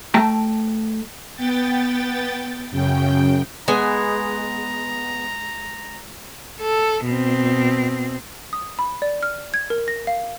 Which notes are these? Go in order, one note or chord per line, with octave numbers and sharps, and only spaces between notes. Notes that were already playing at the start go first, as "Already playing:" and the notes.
A3 G5 A5 A#5
B3 G5 A6
F#2 C#3 G5
G#3 B3 G#5 A#5
A4
B2 C4
D#6
B5
D5
F6
G#6
A#4
A#6
F5